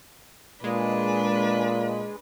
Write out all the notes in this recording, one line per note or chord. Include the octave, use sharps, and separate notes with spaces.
A#2 G#3 D4 B4